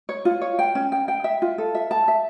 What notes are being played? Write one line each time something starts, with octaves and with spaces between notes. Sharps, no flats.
C#5
F4
C#5
G5
C#4
G5
G5
E5
F4
A4
E5
A5
E5